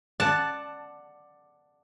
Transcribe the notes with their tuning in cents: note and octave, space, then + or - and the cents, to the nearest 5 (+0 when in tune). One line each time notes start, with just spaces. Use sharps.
D5 +10 F#5 +0 A5 +0